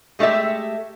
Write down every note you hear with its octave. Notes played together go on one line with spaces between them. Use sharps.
G#3 A3 D4 G4 E5